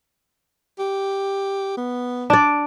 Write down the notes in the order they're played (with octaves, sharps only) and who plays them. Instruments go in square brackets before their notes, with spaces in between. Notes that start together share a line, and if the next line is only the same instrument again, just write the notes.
[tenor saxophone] G4
B3
[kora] D4 D5